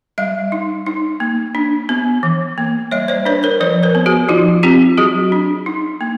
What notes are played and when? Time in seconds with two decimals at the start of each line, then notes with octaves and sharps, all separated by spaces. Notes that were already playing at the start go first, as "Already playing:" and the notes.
0.18 G3 D#5 F5
0.52 D#4
0.86 D#4
1.20 A#3
1.55 D4
1.89 B3
2.23 E3
2.58 A#3
2.91 G3 C#5 D#5
3.08 C5 D5
3.25 D4 B4 C#5
3.43 A#4 C5
3.60 F3 B4 C#5
3.83 A#4 C5
3.95 B3
4.06 F#4 G#4
4.29 F3 D#4 F4
4.63 C4 F4 G4
4.97 F#3 F#4 G#4
5.32 D4
5.66 D#4
6.01 A#3